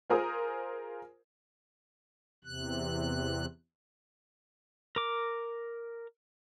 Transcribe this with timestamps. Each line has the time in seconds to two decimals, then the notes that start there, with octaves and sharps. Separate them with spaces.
0.10 F4 G#4 A#4 C5 D#6
2.45 E2 C3 F#6
4.96 A#4 D6